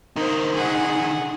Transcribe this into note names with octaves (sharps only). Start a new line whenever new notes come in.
D3 A#3 D#4 C5
G#4 F#5